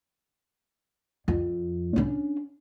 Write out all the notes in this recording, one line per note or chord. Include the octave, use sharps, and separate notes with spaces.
F2
C#4 D4